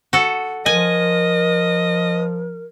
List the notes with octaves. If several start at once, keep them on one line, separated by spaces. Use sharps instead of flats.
F#4 A4
F3 A#4 D#5 G#5